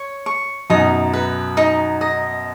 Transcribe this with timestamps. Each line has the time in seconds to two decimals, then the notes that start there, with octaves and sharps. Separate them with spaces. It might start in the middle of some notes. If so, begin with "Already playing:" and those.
Already playing: C#5
0.26 C#6
0.70 F#2 B2 D#4
1.13 B4
1.57 D#4
2.01 D#5